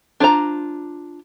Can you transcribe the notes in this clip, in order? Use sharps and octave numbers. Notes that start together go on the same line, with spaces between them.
D4 F4 C5 A#5